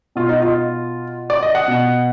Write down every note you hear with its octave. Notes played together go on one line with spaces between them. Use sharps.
B2 F4
D#4
F4
D5
D#5
F#5
B2